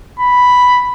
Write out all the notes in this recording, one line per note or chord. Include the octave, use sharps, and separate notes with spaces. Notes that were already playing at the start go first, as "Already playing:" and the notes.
B5